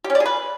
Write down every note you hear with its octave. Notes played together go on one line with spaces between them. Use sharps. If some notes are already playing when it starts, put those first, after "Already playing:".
G4
C#4
D5
G#4
B4